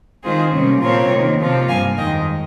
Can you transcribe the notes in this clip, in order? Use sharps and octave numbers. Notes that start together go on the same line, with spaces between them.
D#3 G#3 C4 F4 G#4 C5
C3 G3 A#3 C#4
A#2 F3 C4 F4 A#4 C#5
C3 D#3 A#3
C3 F3 C4 F4
G2 G3 A#3 F5 G#5
F2 D#3 G#3 D#5 G5